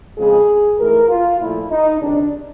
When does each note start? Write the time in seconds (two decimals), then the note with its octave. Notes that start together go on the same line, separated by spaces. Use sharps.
0.18 F2 C#3 F3 G#3 G#4
0.78 G#2 E3 A3 A#4
1.09 F4
1.40 A#2 F3 A3 E4
1.70 D#4
2.00 C#2 C3 D#3 D4